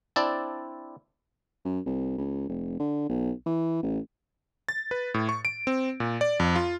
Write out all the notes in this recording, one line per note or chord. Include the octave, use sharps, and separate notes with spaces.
C4 D4 E4 D5 A5
F#2
C2
C#2
F1
D3
B1
E3
A1
A6
B4
A2
C#6
D7
C4
A#2
D5
F2
F4